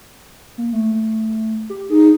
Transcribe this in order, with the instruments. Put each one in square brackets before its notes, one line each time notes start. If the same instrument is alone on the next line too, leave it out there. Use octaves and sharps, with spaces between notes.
[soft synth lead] A#3
A3
G4
[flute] D#4 [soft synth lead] G#4